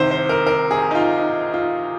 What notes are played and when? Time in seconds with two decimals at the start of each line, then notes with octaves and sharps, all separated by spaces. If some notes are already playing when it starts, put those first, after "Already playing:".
Already playing: C2 C3 D#3 C5
0.11 C5
0.29 A#4
0.47 A#4
0.71 G#4
0.91 D#4
0.95 F4
1.18 D#4
1.54 F4